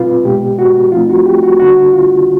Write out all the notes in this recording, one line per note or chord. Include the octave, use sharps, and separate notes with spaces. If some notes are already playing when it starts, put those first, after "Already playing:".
Already playing: B2 G3 C4 D#4 F4 B4
B2 G#3 B3 G4
F#4
F3 A3 C4 D#4 F4
F#4
G4
F#4
D3 G3 A#3 D4 F#4
F4